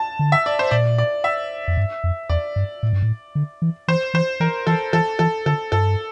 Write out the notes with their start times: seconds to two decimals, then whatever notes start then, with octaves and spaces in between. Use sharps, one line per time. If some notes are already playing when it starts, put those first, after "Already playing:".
Already playing: A5
0.19 D3
0.32 E5
0.46 D5
0.59 C5
0.71 A#2 D5
0.98 D5
1.24 E5
1.68 F2
1.77 G2
2.04 F2
2.30 E2 D5
2.56 G2
2.83 A2
2.93 G2
3.02 A2
3.35 D3
3.62 E3
3.88 E3 C5
4.14 E3 C5
4.40 E3 A#4
4.67 E3 A4
4.93 E3 A4
5.19 E3 A4
5.46 D3 A4
5.72 G2 A4